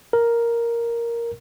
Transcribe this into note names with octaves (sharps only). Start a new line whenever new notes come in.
A#4